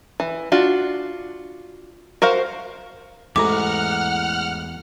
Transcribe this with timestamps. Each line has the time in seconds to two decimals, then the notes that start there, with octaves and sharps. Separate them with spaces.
0.20 E3
0.52 D4 F4 F#4
2.22 F#4 A#4 C5 F5
3.36 A1 E2 G#2 E4 F#5 A#5 D6 F6